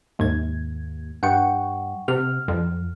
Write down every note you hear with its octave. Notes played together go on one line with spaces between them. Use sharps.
D#2 G#2 G#6
G2 F#5 G5 C#6
C3 F6
F2